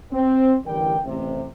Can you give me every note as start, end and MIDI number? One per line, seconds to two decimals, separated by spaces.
0.12 0.56 60
0.66 0.98 33
0.66 0.98 50
0.66 0.98 52
0.66 0.98 55
0.66 0.98 70
0.66 0.98 79
1.05 1.45 33
1.05 1.45 48